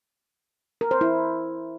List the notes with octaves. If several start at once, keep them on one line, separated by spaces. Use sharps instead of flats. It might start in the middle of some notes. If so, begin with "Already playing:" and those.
A#4
C5
E4